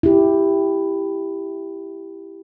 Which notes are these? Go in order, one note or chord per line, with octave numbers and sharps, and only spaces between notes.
E4 G4